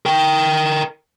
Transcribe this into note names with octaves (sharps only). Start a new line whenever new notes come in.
A#4 G5